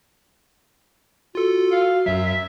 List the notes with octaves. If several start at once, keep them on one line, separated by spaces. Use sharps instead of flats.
F4 F#4 A4
F5
F#2 F#3 E5
E5